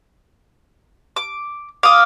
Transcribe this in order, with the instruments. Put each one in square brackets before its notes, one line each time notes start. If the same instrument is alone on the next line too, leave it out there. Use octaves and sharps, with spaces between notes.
[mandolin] D6
[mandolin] F5 D#6 [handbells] D6